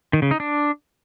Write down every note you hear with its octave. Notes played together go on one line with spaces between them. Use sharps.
D#3
C#3
D#4
D4